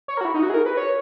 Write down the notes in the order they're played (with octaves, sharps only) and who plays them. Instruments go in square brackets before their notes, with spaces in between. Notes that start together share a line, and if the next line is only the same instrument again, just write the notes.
[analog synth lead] C#5
A#4
F#4
E4
D#4
F#4
G#4
A#4
B4
C#5